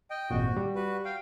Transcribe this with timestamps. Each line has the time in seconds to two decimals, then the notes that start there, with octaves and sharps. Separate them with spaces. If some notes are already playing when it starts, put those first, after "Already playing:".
0.10 D#5 G5
0.30 G#1 F2 A#2 F#4
0.57 G3
0.75 F#4 B4
1.05 F5 G5